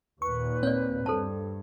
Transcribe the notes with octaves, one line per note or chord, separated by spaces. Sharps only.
D#2 A#2 B4 C#6
C4 C#5 D5
G2 A4 C5 A5